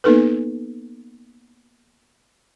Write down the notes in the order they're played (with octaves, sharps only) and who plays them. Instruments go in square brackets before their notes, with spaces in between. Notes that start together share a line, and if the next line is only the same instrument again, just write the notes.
[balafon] A#3 B3 D#4 A4 B4